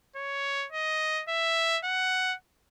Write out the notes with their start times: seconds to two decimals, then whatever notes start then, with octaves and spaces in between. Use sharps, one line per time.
0.16 C#5
0.72 D#5
1.28 E5
1.84 F#5